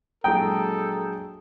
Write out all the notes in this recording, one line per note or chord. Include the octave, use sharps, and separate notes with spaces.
A#1 F#3 G#3 A4 G5 A#5 D#6 G6